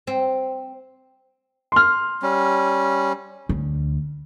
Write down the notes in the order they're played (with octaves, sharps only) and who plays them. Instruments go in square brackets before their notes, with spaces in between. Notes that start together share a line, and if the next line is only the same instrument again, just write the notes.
[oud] C4
[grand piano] C6 F6
[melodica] G3 C#4
[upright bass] D2